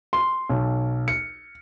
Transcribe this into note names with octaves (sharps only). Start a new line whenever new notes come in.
C6
B1
C#7